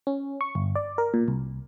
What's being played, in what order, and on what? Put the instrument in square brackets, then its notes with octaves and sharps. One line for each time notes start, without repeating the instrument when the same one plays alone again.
[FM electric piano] C#4
C#6
G1
D5
A#4
A#2
C2